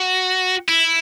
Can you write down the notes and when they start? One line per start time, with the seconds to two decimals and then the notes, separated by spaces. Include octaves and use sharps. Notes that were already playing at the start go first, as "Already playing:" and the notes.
Already playing: F#4
0.68 E4